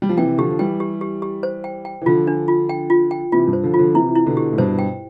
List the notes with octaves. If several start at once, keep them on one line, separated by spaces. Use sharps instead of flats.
G3
F3
C3 E3 G5
D3 F3 G4
F3
E3 G3 G5
G4
G4
G4
C5
G5
G5
E3
D3 F3 F4
D4
F4
G5
F4
G5
C3 E3 F4
G2
C5
D3 F3
F4
D3 F3
C3 E3 E4
E4
B2 D3
G4
A2
G2 B2 C5
G5